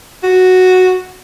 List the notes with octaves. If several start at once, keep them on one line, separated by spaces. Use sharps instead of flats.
F#4